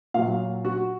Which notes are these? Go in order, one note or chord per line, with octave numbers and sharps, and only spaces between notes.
A#2 F#3 F5
F#4